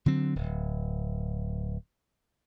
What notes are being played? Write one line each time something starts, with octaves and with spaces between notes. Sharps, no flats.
D3 F#3 C4
D1